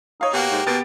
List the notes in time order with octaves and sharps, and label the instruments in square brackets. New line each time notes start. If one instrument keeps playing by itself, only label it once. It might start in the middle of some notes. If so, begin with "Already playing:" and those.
[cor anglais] D#4 [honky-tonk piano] C#5 F5
[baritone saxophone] B2 [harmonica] A#3 F#4 [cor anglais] G4
[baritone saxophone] G#2
[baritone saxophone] B2 [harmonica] A#3 [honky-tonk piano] B3 A6 D7